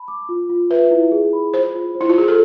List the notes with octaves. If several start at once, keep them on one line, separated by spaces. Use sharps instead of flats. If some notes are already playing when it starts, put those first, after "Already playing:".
Already playing: A5 B5
D6
F4
F4
B4 E5
E4
G#4
B5
F4 C5
F4
C5
E4
F4
G#4 C5
A4